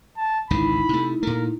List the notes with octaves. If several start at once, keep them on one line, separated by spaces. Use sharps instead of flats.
A5
G#1 C#2 D3 D#4 E4 B5
C3 A3
A#2 A3 A#4